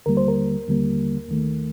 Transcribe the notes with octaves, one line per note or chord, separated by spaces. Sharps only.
D#2 D3 G3 A#3 A#4
C5
A#4
D#2 D3 G3 A#3
D#2 D#3 A3